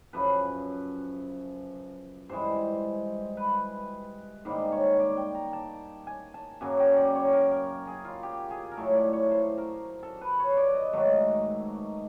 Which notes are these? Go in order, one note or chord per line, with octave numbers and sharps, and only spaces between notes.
F#2 C#3 F3 B4
G2 E3 G#3 C5
B4
G#2 D#3 G3 A#3 C5
C#5
D5
G5
A#5
A5
G#5
A5
F#2 C#3 F#3 A#3 G#5
G5
D5
C#5
A#4
A#4
G#4
F4
G4
G#4
A#4
A2 F#3 A3 A4
D5
C#5
C5
A#4
A4
B4
C#5
D5
D#5
G#2 D#3 F#3 A3